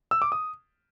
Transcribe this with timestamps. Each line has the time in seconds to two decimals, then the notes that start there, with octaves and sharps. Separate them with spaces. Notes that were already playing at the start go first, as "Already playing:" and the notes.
0.11 E6
0.22 D6
0.32 D#6